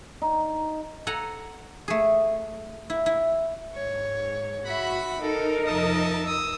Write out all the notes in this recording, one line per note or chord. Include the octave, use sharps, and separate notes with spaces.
D#4
A4 F#5 G#5 A#5
A3 G#4
E4
E4
G#2 C#5
F#4 E5 F#5 B5
D#4 A4 A#4
F1 F3 D#5 E5 A5 D#6
D#6 E6